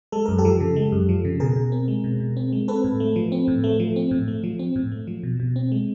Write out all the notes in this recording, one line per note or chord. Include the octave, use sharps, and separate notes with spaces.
G#3 A4
F#2 A#4
G4 A4
F3
C#3
G#3
F#2
F3
C#3
B2 G#4 A#4
B2
C4
G#3
B2
B2
C4
G#3
C4 A4 B4
A2
A3
F3
C4
A2
A3
F3
C4
A2
A3
F3
C4
A2
A3
F3
B2
B2
C4
G#3